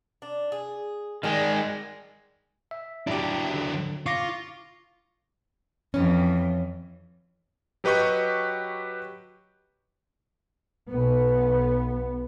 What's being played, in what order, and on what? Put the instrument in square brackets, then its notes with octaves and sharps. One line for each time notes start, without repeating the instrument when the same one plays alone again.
[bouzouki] D4
G#4
[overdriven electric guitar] D#3 G#3 [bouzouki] G3 G#4
[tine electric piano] E5
[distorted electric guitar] F#3 D4 [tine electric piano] E4 G4
[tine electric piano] D3
[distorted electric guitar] F4 [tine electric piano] C#6 D6 A#6
[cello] F2 E3 [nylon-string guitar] C#4
[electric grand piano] F#3 G4 B4 D#5 C#6 G6
[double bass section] B1 B3